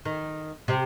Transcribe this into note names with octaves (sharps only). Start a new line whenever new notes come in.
D#3
C3